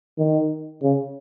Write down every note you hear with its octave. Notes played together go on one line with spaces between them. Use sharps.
D#3
C#3